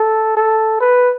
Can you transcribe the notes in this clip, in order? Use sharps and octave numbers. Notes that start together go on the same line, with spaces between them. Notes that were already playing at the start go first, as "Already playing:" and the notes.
Already playing: A4
A4
B4